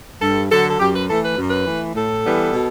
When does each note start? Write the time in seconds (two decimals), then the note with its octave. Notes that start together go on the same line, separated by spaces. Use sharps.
0.22 G2 A4
0.51 D3 F#3 A4
0.69 A4
0.80 F#2 G4
0.94 B4
1.09 E3 A3 A4
1.24 B4
1.38 F#2
1.50 B4
1.67 E3 A3
1.95 A2 A4
2.25 E3 G3 B3
2.54 B2